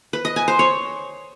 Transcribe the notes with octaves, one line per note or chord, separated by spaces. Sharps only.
B4
D#5
G#5
C5
C#5